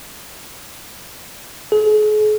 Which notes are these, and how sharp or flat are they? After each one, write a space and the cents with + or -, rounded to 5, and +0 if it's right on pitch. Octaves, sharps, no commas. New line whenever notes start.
G#4 +40